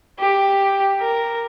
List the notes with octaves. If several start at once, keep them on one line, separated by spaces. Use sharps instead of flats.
G4
A#4